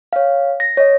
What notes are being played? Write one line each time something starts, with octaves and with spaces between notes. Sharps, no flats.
C#5 F5
A#6
C#5 D#5